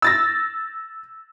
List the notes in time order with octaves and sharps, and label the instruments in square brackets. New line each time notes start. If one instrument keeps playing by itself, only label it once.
[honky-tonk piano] E6 A6 A#6